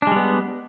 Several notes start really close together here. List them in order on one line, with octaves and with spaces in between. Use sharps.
D4 G#3 G3 B3